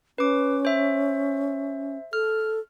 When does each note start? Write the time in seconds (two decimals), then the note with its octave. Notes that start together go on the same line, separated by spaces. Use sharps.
0.18 C#4 B4 D6
0.65 C5 E5
2.13 A4 F6